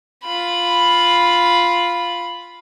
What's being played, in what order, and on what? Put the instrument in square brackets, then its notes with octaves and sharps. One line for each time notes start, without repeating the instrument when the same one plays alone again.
[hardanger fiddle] F4 B5